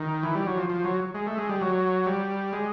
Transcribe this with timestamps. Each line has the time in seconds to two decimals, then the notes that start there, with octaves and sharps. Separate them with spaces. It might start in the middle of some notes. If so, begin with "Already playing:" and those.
Already playing: D#3
0.23 E3
0.35 G3
0.46 F#3
0.57 F3
0.70 F3
0.84 F#3
1.15 G#3
1.27 A3
1.38 G#3
1.49 G3
1.61 F#3
2.06 G3
2.53 G#3